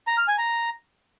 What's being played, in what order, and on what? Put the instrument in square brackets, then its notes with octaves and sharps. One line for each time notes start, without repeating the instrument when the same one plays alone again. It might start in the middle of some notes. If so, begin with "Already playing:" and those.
[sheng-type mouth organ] A#5
F6
G#5
A#5